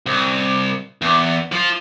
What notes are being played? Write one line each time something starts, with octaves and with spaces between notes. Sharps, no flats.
C2
E2
F3 F4